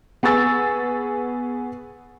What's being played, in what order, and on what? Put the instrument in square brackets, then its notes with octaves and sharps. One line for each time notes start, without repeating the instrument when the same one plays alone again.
[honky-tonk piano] B3 G#4 C#6 E6 A6